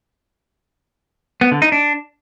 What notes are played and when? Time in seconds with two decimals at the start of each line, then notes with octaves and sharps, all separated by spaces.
1.41 B3
1.52 D3
1.62 D#4
1.72 D4